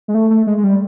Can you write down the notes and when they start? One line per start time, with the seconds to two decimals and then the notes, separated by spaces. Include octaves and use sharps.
0.08 G#3
0.14 A3
0.30 A3
0.47 G#3
0.57 G#3
0.64 G3